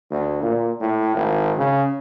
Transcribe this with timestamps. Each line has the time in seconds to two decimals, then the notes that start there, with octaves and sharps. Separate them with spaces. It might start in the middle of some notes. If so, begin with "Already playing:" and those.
0.11 D2
0.42 A#2
0.81 A2
1.15 G#1
1.57 C#3